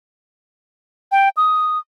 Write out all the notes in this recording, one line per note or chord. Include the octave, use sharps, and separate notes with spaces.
G5
D#6